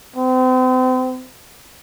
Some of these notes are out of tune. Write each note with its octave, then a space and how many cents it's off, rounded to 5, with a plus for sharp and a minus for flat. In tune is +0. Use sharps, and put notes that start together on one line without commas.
C4 -35